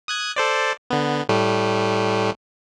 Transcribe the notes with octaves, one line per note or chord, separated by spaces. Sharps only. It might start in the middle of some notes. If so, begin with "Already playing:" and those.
D#6 F#6 G#6
A4 C5 D5
D3 B3
A2 G3 A3